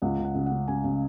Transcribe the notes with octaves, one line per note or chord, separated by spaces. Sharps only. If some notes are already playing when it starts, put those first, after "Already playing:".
C#2 F#5
C#3
F#5
C#3
F#5
C#3
C#3 G#5
C#3